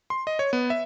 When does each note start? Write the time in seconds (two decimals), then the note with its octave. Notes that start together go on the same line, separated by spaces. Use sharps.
0.10 C6
0.27 D#5
0.39 C#5
0.53 B3
0.70 E5